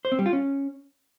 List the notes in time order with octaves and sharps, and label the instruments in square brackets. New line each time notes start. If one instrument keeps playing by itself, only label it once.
[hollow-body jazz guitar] C5
C4
G3
F4
C#4